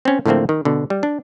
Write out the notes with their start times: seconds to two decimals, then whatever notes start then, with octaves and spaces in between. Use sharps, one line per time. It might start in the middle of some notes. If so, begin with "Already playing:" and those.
0.05 C4 C#4
0.26 A2 D3 F3 A3 A#3 C4
0.49 D#3
0.65 B2 D3
0.90 G3
1.03 D4